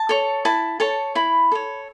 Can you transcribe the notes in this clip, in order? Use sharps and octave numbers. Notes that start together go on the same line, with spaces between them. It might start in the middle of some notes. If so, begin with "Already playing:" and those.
Already playing: A5
A4 C#5
E4 A5
A4 C#5 A5
E4 B5
A4 C#5